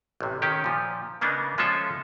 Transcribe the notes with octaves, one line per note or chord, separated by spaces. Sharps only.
A1 C3
D#3 C#4 G4
A#2 F3
C#3 A#3 B3 D4 D#4
F3 G#3 C#4 F4 A4 E5